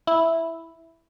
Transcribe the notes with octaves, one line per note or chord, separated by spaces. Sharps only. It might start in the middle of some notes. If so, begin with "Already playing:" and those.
E4